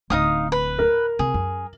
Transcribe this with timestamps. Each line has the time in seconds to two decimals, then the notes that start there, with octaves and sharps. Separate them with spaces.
0.10 D1 D#4 F5 D#6
0.52 B4
0.79 A#4
1.19 C3 G#4
1.34 F#2